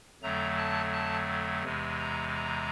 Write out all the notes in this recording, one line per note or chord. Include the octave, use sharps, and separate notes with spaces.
F2 D3 F#3 A3 A#5
A5
A5
E2 C3 E3 G#3
A#5
A#5